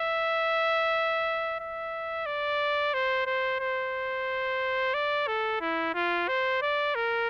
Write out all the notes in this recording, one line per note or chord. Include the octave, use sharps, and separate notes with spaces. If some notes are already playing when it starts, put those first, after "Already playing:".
Already playing: E5
E5
D5
C5
C5
C5
D5
A4
E4
F4
C5
D5
A#4